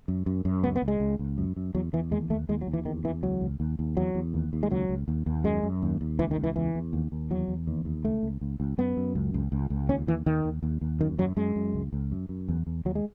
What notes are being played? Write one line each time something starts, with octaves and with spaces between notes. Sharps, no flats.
F#2
F#2
F#2
C#2 B3
B3
C#2
G#3
C#2
C#2
F#2
F#2
E2 F#3
E2 E3
D#2 G#3
D#2 A3
D#2 G#3
F#3
D#2
E3
E2 D#3
E2 E3
C#2 F#3
C#2
D#2
D#2
E2 F#3
E2
D#2
D#2
G#3
C#2 F#3
C#2
D#2
D#2
F#2 G#3
F#2
D#2
D#2
C#2 E3
D#3
C#2
E3
E2 E3
E2
D#2
D#2
E2 F#3
E2
D#2
D#2
C#2 A3
C#2
C#2
C#2
F#2 B3
F#2
C#2
C#2
C#2
C#2
D#2 C#4
D#2 E3
D#2 D#3
D#2
D#2
D#2
F#2 D#3
F#2 F#3
F#2 G#3
F#2
C#2
C#2
F#2
F#2
E2
E2
D#2 F#3
G#3